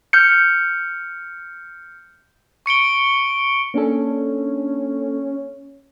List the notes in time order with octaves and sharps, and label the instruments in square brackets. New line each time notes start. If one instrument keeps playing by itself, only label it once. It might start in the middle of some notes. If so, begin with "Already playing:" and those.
[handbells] F6 G6 C#7
[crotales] C#6 C#7 D7 G7
[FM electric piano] A#3 D4 A4 [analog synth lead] C#4